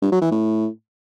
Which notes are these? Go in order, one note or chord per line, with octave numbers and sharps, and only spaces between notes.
G2
F#3
E3
A2